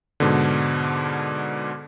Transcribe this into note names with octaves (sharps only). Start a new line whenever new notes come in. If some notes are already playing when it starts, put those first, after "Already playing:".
G#2 B2 D3